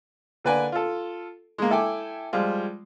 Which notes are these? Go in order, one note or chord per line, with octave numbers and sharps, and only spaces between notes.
D3 A#3 B4 D5 G#5
F4 A4
G#3 A#3
E4 A4 E5 G5 G#5 D6
F3 G3 G#3 F4